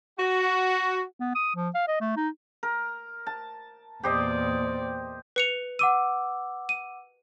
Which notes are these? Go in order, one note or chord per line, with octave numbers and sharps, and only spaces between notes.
F#4
B3
D#6
F3
F5
D#5
A3
D#4
A#4
A5
E2 A#2 G4 C5 D5 D#5
B4 C#7 F7
F#5 D6 E6 D#7
D#7